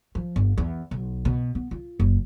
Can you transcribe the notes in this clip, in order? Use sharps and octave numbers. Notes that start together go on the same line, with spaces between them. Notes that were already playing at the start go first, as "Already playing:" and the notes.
F3
G1
E2
B1
B2
B3
F4
F#1